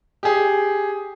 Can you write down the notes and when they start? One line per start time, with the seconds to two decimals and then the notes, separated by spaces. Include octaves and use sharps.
0.23 G4 G#4